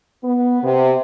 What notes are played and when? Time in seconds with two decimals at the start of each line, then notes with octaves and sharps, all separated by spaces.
0.23 B3
0.63 C3